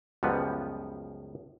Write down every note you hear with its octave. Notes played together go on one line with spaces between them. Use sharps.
C#2 F#2 F3 G3 B3 B4